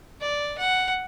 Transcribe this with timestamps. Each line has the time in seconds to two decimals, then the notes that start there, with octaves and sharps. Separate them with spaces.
0.21 D5
0.58 F#5